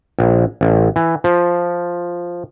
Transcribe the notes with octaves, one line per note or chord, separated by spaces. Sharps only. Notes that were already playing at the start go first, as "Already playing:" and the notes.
A#1
A1
E3
F3